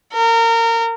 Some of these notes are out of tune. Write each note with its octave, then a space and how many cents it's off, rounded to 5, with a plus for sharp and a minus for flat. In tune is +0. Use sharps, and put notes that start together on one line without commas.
A#4 -25